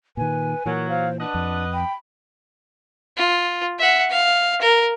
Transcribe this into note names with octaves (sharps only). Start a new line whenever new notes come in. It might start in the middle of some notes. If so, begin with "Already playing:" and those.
A#2 D#3 B4 G#5
A#2 E3 F#3 A#4
C5 F5
D4 B4 D#5 F#5 A5
F2
G5 B5
F4
E5 F#5
F5
A#4